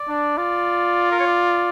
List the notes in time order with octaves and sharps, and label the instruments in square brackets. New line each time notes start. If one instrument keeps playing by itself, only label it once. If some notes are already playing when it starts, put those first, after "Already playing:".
Already playing: [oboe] D5
[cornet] D4
[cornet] F4 [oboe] D5
[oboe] A#4
C#5
D5